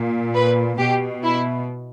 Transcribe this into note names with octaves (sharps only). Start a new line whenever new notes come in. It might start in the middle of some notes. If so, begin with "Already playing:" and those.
Already playing: A#2
B4
B2 G4
E4